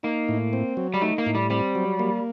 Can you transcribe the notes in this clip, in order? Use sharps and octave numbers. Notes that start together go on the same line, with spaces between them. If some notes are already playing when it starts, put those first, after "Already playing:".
A#3 D#4
A2
C4
F#3
G3
A3 D#4
A#3
A2
G3
G3 C4
F#3
A#3